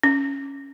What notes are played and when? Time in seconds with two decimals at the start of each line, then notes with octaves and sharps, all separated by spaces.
0.03 C#4